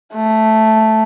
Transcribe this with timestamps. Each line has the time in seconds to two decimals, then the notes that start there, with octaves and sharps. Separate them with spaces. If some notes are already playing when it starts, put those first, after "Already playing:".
0.15 A3